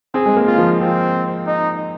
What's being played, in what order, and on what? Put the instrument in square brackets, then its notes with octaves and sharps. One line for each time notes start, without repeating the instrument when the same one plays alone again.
[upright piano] C4 [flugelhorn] G#4
[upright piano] G#3
A#3
[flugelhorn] F4
[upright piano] F3
[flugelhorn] C4
D#4